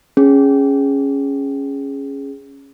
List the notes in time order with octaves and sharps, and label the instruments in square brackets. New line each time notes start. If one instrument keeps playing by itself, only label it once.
[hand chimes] C#4 G#4